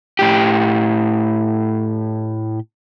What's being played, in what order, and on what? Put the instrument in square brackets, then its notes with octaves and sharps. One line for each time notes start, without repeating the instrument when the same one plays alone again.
[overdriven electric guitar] A2 G4